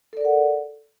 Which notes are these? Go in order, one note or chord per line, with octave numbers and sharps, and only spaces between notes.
A4 A#4 D5 F#5